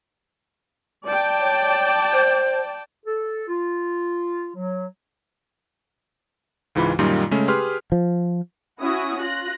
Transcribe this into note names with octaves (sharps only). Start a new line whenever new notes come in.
D5 G5 A5
C#5
C5
A4
F4
F#3
C#2 G#2 E3 F4 B5
F#2 A#2 D#3 G3 D#4 F4
C#3 G#3 A3 C#4
G4 G#4 B4 C6 F6
F3
C#4 E4 F#4 D#6
F4 F#6 A#6